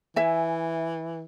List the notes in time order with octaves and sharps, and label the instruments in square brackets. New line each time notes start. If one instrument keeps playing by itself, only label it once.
[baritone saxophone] E3 [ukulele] E5 G#5